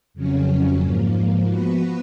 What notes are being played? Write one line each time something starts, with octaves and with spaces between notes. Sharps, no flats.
F2 C#3 F#3 C#4
G#2 F3 A#3
F3 B3 F#4 B4